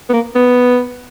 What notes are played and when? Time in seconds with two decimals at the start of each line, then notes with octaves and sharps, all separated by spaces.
0.09 B3
0.13 A#3
0.35 B3